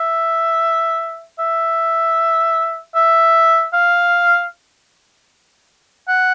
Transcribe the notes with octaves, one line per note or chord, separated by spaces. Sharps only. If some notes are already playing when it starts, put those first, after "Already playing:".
Already playing: E5
E5
E5
F5
F#5